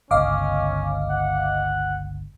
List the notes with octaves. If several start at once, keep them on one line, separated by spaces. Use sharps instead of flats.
G1 C#2 C#4 D#5 F5 D6
F#5